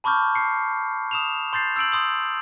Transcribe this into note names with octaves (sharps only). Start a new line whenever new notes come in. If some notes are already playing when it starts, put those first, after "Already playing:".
A5 B5 C#6 D6 F6 G6
C7 C#7
D#6 E7 F7
C6 G6 A6 C7
E6 G6 D7 F#7
C6 D#6 F#7